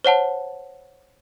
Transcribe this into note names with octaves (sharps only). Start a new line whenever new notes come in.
C5 C#5 F#5 A5